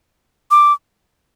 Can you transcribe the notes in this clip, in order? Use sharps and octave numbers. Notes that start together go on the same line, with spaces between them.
D6